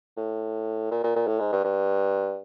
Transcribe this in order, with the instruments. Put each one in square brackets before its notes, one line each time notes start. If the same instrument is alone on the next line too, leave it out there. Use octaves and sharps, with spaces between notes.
[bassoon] A2
A#2
A#2
A#2
A2
G#2
G2
G2